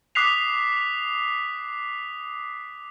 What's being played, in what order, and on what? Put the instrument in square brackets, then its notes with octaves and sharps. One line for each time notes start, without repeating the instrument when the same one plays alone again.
[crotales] D6 D#6 F#6 B6 C7 F7